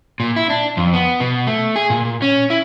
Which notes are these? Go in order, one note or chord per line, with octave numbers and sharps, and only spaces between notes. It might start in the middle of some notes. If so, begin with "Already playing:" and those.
A#2
E4
D4
F2
B3
B2
A3
G#4
A#2
C#4
E4